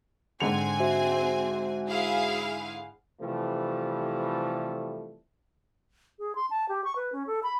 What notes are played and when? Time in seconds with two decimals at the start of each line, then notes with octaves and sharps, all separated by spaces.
0.40 G#2 D3 C4 G#5 C#7 F7
0.80 F#4 C5 E5
1.88 E4 G#4 F5
3.21 C3 E3 F3 G3 A3
6.19 G#4
6.35 C6
6.50 A5
6.68 G4
6.84 C#6
6.96 B4
7.12 C#4
7.27 A4
7.43 B5